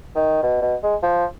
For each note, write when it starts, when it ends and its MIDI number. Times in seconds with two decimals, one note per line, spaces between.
0.15 0.39 51
0.43 0.61 47
0.61 0.75 47
0.83 0.95 56
1.03 1.25 53